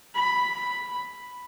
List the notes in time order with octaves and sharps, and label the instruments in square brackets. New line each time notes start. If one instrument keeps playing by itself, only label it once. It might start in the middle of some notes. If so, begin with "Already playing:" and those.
[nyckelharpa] B5